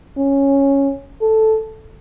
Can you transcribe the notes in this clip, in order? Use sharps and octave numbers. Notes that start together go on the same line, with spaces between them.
C#4
A4